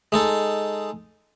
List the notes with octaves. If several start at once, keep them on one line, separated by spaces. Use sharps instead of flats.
G#3 D#4 A4